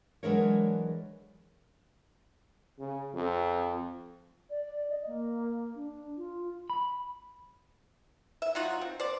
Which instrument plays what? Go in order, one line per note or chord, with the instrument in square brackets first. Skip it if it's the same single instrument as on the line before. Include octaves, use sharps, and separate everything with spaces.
[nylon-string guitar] E3 F#3 G#3 D4 A#4 C#5
[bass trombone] C#3
F2
[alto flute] D5
D#5
A#3
D4
F4
[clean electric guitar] B5
[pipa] E5
F#3 D#4 F4 F#4
C4
C5 D5